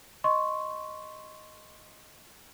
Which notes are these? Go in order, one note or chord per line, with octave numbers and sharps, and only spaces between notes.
D#5 C6 C#6